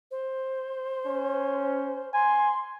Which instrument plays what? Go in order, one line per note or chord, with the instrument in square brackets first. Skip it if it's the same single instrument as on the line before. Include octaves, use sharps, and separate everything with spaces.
[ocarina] C5
[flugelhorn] C#4
[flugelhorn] G#5 [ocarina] C6